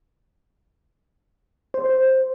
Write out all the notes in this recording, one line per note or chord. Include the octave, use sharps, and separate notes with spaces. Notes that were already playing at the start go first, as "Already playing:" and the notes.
C5